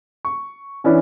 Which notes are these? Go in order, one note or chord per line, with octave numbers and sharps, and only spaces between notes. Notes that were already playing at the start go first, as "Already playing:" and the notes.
C#6
E3 C#4 D4 E4